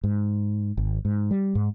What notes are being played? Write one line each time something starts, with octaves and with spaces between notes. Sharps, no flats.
G#2
G#1
G#2
G3
G#2